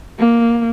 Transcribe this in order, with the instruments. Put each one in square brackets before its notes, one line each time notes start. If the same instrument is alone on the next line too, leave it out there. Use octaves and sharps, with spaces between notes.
[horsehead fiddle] A#3